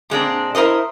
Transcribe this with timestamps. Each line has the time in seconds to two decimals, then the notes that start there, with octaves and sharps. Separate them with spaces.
0.10 A#2 G#3 C4 D4
0.55 E4 A#4 C5 D#5